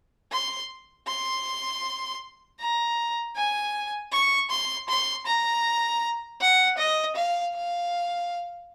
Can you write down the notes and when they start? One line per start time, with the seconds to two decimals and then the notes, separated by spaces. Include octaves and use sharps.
0.32 C6
1.07 C6
2.60 A#5
3.36 G#5
4.12 C#6
4.50 C6
4.89 C6
5.26 A#5
6.41 F#5
6.78 D#5
7.16 F5
7.55 F5